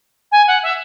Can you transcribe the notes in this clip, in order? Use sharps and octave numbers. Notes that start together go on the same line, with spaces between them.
G#5
F#5
E5